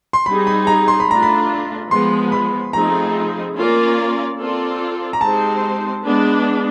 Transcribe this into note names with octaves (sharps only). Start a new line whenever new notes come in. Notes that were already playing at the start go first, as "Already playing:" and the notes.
C6
G3 C4 D#4 G#4 B5
B5
A#5
C6
B5
A3 D4 F4 A#5
B5
F3 G#3 B3 C6
B5
F3 A3 C4 D#4 G#4 A#5
A#3 C#4 F4 A#4 D5
C4 F4 A4 D5
A#5
G#3 C4 D#4 G4 C5 A5
G#3 B3 D4